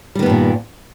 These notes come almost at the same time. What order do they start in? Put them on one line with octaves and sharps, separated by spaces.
G3 D#3 B3 G2 A#2